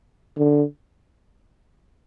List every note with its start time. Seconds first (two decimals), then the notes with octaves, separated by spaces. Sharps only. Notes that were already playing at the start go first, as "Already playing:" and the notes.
0.38 D3